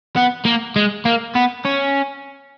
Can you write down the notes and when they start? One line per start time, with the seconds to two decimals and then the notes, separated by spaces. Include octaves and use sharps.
0.16 B3
0.45 A#3
0.76 G#3
1.05 A#3
1.35 B3
1.65 C#4